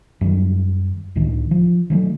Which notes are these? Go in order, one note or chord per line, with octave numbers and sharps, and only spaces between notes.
F#2 D#3 F#3 G3
C#2 A2 D#3 D4
F3
D#3 F#3 A3